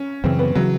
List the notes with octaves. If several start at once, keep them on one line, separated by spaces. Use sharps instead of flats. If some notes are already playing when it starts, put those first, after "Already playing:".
Already playing: C#4
F#2 C#3 E3 C4
B3
C#3 E3 F#3